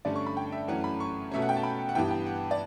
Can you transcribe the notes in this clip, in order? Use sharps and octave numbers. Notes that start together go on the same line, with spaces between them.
G2 D3 A3 C#4 D5
C#6
B5
G5
E5
F#2 E3 A3 C#4 F#5
B5
C#6
B2 A3 C#4 E5
F#5
G5
A5
B5
F#5
G2 E3 B3 G5
G5
F#5
D5